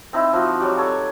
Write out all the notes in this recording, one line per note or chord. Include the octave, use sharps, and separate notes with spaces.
C4 D#4 E4
F3 F#4
F#3 G3 F#4 G4
A4 C#5